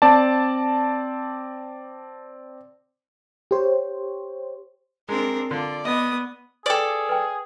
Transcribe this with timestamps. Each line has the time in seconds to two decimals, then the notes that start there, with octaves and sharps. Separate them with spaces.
0.02 C4 D5 A5
3.51 G4 C5 C#5
5.09 G#3 C4 D4 A#4
5.51 D3 F4 D5
5.85 B3 D#5 D#6
6.66 G#4 A4 B4 D5 G5
7.09 B4 G5